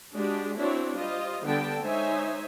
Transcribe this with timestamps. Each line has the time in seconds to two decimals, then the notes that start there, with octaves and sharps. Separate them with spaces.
0.14 G#3 D4 F#4 G4
0.57 C4 D4 E4 F#4 C#5
0.95 G3 F4 C5 D#5
1.44 D3 G3 B3 G5 A5
1.81 G#3 D#4 C5 C#5 E5 G#5